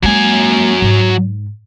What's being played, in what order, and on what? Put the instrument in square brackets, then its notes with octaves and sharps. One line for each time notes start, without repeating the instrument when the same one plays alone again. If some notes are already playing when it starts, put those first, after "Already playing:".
[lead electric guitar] F#3 G#5 [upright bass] G#3 A#3
[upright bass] G#2